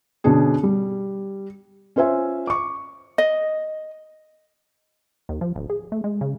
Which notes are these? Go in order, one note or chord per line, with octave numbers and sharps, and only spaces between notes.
B2 D3 C#4 D4 G#4
G3
C#4 F4 C5 E5 G#5
C#6 D6
D#5
D#2
F3
D1
G#4
A3
G#3
C#3